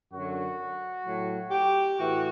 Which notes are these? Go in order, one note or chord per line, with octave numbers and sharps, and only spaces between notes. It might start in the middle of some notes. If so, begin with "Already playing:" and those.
F#2 D3 F#3 F#4
A2 F#3
G4
A2 E3 F#4